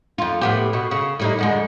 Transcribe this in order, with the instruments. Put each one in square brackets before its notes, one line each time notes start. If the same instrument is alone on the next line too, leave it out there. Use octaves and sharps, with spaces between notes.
[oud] F2 F4
A2 B3 G4
B2
C#3
A2 G3 D#4
F2 D3 G#3